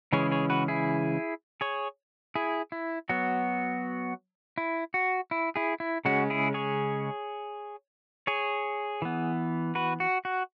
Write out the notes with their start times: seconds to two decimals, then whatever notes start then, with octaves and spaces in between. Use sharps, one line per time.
0.12 C#3 E3 G#3 C#4 G#4 C#5
0.31 G#4 C#5
0.50 F#4 B4
0.68 E4 G#4
1.61 G#4 C#5
2.36 E4 G#4
2.72 E4
3.09 F#3 B3 F#4
4.58 E4
4.94 F#4
5.31 E4
5.56 E4 G#4
5.80 E4
6.05 C#3 G#3 C#4 F#4
6.30 E4 G#4
6.54 G#4 C#5
8.27 G#4 C#5
9.02 E3 B3
9.75 F#4 B4
10.00 F#4
10.25 F#4